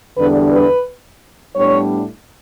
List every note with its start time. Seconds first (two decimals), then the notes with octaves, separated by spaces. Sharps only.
0.17 E2 D3 G3 B3 D4 B4
0.52 B4
1.56 A2 G3 B3 D4 C#5